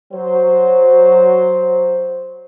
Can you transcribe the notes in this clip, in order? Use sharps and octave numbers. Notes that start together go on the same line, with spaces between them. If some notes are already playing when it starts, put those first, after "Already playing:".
F#3 C5